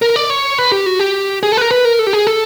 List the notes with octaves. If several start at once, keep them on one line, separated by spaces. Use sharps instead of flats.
A#4
D5
C#5
B4
G4
F#4
G4
G#4
A4
B4
A#4
B4
A#4
A4
G4
G#4
A4